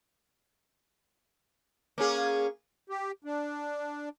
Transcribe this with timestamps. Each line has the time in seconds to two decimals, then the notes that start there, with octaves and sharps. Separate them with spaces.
1.98 A#3 C#4 G#4
2.90 G4
3.24 D4